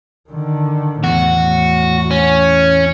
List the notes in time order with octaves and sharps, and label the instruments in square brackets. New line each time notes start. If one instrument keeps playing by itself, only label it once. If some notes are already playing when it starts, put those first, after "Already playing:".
[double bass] D3 D#3
[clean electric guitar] E2 [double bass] A2 [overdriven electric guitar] F#4
[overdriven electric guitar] C#4